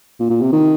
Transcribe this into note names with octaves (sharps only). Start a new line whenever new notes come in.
A#2
A#2
C3
D#3